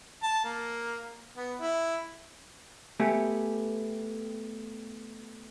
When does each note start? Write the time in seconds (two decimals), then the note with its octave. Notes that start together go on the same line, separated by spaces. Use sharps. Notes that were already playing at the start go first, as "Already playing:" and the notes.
0.23 A5
0.45 A#3
1.37 B3
1.61 E4
3.00 A3 B3 G4 G#4